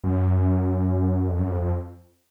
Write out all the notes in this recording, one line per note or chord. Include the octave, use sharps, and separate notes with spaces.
F#2
F2
F#2
F2
F2